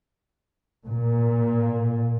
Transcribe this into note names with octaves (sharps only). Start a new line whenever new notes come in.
A#2